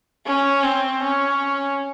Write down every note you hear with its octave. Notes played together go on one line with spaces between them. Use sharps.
C#4
C4
C#4